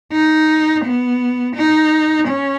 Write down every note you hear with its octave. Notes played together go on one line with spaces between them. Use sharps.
D#4
B3
D#4
C#4